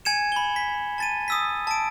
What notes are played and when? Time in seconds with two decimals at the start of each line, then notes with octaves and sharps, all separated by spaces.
0.05 G#5 G#6 C#7 E7
0.32 B5 G7
0.56 B6
0.98 A5 A6 D#7
1.28 D#6 E6 B6
1.67 A5 D7